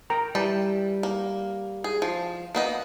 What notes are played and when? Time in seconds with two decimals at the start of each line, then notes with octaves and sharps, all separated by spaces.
0.10 A#4 G5 A#5
0.35 E3 G3 G5 A5
1.03 A#3
1.84 G#4
2.02 F3
2.55 A#3 B3 D#5